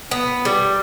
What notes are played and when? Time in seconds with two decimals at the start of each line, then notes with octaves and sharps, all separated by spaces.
0.11 B3
0.45 G3